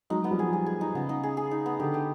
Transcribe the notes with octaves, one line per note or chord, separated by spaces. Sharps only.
F#3 G#3 D#4
B3
F3 G3
G#4
G#4
G#4
D#4
C#3 B3
D#4
G#4
G#4
D#4
B3
D3 G4
G4